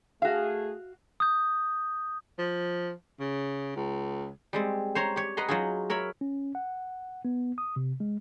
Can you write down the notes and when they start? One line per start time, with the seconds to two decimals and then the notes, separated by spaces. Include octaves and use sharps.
0.22 A3 F#4 G#4 F5
1.20 D#6 G6
2.39 F3
3.20 C#3
3.76 C#2
4.53 G3 G#3 C4
4.95 C5 C#5 A#5 C6
5.16 G4 C#5
5.37 B4 D#5 F#5 A#5 C6
5.48 F#3 D#4 F4 F#4 G#4
5.90 A#4 C#5 E5 B5
6.21 C#4
6.55 F#5
7.25 B3
7.58 D#6
7.76 C3
8.00 G#3